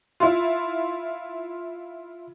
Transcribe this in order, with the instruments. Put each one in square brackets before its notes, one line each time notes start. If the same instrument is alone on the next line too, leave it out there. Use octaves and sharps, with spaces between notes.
[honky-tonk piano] E4 F4